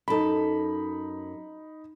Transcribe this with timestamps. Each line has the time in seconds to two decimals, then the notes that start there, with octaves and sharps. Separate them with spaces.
0.08 F#2 D#4 A4 B5